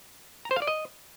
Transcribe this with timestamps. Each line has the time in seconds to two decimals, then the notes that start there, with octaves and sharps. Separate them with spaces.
0.45 A#5
0.51 C5
0.56 F5
0.62 D5
0.67 D#5